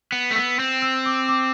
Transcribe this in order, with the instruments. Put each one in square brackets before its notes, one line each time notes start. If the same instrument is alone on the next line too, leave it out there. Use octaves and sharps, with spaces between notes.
[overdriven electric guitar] B3
A3
[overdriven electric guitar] B3 [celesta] E6
[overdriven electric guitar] C4
[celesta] E6
D6
D6